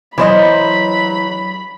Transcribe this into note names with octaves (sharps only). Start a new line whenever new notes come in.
E3 F#3 C5 D#5 B5